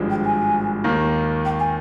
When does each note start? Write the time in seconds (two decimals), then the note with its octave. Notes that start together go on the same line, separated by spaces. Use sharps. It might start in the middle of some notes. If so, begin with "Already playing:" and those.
Already playing: G#1 G2 F3 G#3 D4
0.09 G5
0.24 G#5
0.84 D#2 D#3 A#3
1.44 G5
1.59 G#5